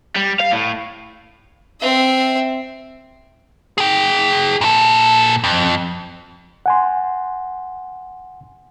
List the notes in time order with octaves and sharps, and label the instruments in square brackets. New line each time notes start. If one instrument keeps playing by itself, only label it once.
[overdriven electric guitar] G3
F5
A2
[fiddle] C4 E5
[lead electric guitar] G#4 G5
A#2 A4
F2
[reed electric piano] F#5 G#5 C6